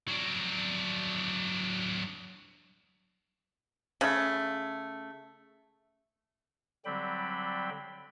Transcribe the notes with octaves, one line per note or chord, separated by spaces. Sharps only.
F#3 D4
C#3 A3
D3 F#3 G3 C4 G5 B5